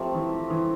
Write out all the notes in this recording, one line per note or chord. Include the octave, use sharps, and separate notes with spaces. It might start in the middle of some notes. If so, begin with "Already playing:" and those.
Already playing: F3 A3 C4 G4 A#4
E3
E3